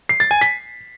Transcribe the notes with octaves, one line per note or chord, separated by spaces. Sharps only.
C7
A6
G#5
B6